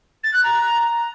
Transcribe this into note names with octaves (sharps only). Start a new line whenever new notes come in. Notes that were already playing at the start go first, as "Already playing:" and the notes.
A6
F#6
A#5